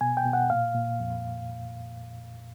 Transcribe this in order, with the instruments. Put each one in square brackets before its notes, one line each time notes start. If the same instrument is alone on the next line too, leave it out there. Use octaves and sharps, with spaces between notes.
[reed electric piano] B2 G#5
G5
B2
F#5
A#2 F5
A#2
F2